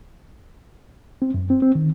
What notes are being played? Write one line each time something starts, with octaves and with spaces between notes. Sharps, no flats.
C4
F#2
C4
C4
D#3